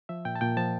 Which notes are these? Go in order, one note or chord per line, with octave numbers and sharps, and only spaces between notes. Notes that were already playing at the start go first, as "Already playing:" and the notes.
F3 E5
A#2 G5
A5
A#2 G5
F3 A5